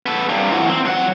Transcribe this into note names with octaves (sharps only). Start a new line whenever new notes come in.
B3 A4
G2 C3
E3 F#3
C4
F#3 F#5